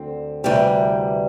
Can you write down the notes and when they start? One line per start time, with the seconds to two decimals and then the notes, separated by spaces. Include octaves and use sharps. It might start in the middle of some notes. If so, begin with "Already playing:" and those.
Already playing: D2 D3 C4
0.44 D2 C3 E3 G3